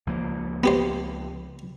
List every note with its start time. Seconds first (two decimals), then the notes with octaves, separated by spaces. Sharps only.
0.07 C#2 F3 A#3
0.64 B3 G4 C5